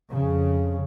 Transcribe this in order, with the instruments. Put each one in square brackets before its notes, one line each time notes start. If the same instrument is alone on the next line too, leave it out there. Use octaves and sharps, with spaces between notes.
[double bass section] F2 C#3